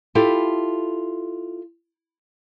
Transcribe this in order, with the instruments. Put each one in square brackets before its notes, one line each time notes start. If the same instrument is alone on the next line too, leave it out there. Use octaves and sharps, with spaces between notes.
[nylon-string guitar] E4 F4 G4 A4